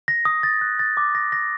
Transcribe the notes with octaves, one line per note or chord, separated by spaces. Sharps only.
A#6
D#6
A6
F#6
A6
D6
A#6
A#6